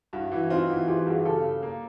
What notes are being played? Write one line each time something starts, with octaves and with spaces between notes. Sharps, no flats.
G2 E4 F#4
E3 E4 F#4
C4 D#4 F4
E3 E4 F#4
E3 F4 G4
G2 F#4 G#4
C#3 G4 A4
C#3
A#3